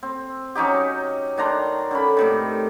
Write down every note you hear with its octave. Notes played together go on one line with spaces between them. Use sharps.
C4
F#3 C#4 D#4 G4
D#3 D4 A#5 C6
D3 C#4 B5
A2 C3 D#3